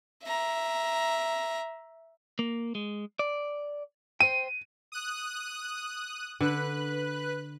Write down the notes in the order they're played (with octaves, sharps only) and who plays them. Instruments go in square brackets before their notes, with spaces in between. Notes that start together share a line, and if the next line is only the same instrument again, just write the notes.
[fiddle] E5 A#5
[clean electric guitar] A#3
G#3
D5
[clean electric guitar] C5 G5 [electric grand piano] D#7
[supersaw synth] D#6 F#6
[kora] D3 [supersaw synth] B4 F#6